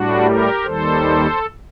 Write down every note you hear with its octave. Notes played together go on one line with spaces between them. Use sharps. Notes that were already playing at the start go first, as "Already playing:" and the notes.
Already playing: A2 G3 D4 F#4
G4 A#4
D#2 D#3 G3 A4 C5